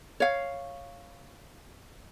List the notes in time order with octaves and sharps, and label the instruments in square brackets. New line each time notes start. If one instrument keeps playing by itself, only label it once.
[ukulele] C#5 F5